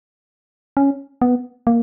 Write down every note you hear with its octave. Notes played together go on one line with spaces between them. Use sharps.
C#4
B3
A#3